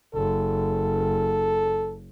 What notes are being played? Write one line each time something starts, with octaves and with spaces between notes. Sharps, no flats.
F#1 A4